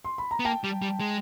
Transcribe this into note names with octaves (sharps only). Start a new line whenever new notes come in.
C6
B5
A#5
B3
A#3 G5 A5
G3
G3
G#3